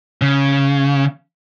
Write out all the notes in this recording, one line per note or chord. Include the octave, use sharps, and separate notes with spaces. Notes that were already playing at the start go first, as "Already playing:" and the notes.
C#3